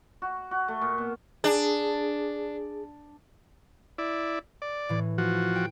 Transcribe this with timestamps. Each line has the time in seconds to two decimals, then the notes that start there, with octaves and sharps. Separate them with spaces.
0.22 F#4
0.51 F#4
0.68 A3
0.81 A#2
0.98 B2
1.44 D4 G#4
3.98 E4 D5
4.62 D5
4.89 A2 E3
5.18 F3 F#4
5.55 G5